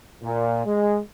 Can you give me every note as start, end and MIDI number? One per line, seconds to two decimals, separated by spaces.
0.23 0.64 46
0.65 0.99 56